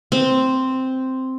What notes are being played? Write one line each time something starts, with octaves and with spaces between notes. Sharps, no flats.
C4